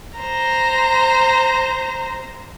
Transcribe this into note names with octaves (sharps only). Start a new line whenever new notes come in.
C5 A#5